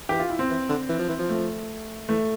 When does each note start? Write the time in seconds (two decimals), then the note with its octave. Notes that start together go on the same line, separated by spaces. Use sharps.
0.09 E3 G4
0.19 F4
0.30 E4
0.39 C4
0.50 E3
0.69 D3
0.89 E3
0.99 F3
1.09 E3
1.19 F3
1.29 A3
2.09 E3 A3